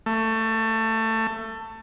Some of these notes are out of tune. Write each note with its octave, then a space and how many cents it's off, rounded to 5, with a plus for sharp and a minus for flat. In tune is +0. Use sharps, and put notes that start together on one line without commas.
A3 +20